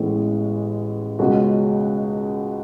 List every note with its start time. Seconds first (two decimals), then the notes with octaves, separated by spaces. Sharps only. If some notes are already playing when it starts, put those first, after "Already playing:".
Already playing: A1 A2 E3 G#3 B3
1.19 C#2 B2 G#3 C#4 F#4